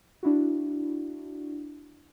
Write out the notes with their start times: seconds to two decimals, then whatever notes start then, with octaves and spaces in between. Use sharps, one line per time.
0.23 D4 E4 F#4